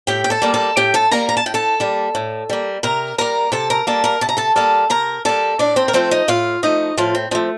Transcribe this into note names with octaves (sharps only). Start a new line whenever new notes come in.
A2 G4 G5
G5
A4 A5
G3 A#3
A4 A5
A2 G4 G5
A4 A5
G3 A#3 A#4 A#5
A#5
A5
A2 G5
A4 A5
G3 A#3
A2
G3 A#3
C3 A#4 A#5
G3 A#3 A#4 A#5
C3 A4 A5
A#4 A#5
G3 A#3 A4 A5
A#4 A#5
C3 A5
A#5
A4 A5
G3 A#3 A4 A5
C3 A#4 A#5
G3 A#3 A4 A5
A2 D4 D5
C4 C5
A#4
F3 A3 C4 C5
D#4 D#5
A2 F4 F5
F3 A3 D#4 D#5
A2 F3 F4
C4
F3 A3 C4